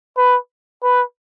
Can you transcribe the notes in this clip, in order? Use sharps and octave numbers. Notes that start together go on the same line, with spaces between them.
B4
B4